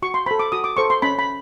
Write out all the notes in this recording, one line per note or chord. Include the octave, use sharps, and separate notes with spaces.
F#4 C#6
C6
A4 C5 B5
D6
F#4 D#6
D6
A4 C5 C#6
C6
C#4 B5
B5